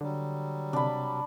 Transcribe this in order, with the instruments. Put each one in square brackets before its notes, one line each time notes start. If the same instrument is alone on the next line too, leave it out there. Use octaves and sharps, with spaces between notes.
[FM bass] D3 [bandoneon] F#3 G3
[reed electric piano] C3 [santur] D4 B5